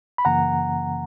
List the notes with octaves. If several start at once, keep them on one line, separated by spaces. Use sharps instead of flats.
B5
F#2 C#3 E3 A#3 F#5 A#5